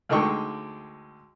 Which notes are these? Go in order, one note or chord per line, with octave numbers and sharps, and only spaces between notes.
D2 D3 G#3 D#4 G5 C#6